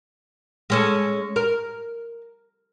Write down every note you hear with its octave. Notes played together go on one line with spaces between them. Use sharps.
G#3 C#4 A4
A#4